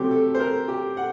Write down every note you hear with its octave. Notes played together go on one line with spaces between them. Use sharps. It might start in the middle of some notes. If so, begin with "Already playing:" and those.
Already playing: C3 F#3 A3 C4 G4
A4
C5
A#4
G4
F#5